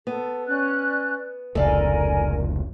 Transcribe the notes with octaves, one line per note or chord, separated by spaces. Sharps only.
B3 A4
C#4 D5 F#6
F1 C#2 A4 A#4 D5 F5 G#5